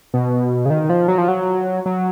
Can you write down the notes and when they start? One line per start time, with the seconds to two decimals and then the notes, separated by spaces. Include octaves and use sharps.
0.14 B2
0.66 C#3
0.70 D#3
0.90 F3
1.08 F#3
1.18 F3
1.28 F#3
1.86 F#3